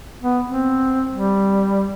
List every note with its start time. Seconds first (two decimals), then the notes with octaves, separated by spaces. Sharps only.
0.21 B3
0.46 C4
1.11 G3